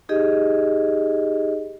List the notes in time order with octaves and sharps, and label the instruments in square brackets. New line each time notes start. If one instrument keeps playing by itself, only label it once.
[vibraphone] D#4 G4 G#4 D#5